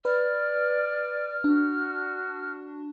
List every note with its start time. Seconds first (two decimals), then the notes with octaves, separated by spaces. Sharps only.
0.05 B4 D5 F6
1.44 D4 F#4